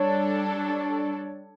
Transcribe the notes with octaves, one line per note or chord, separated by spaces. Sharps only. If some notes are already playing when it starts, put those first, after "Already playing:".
Already playing: G3 D4 A4 C#5